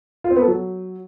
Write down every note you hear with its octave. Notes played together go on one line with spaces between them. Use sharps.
F4
C4
B3
A4
F#3